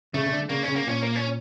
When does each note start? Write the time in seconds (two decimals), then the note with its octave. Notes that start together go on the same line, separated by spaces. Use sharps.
0.14 C#3 A3
0.26 C#3
0.32 D3
0.49 C#3 A#3
0.63 C#3 C#4
0.76 A#3
0.86 A#2 C#4
1.02 A#3
1.16 C#4